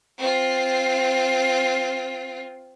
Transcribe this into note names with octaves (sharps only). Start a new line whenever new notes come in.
C4 F4